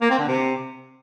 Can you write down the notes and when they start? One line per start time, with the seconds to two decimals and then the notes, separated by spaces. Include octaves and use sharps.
0.01 A#3
0.10 C4
0.19 D3
0.28 C3